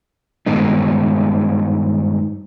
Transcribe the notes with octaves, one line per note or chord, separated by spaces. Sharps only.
G2 D#3 G#3 B3 D#4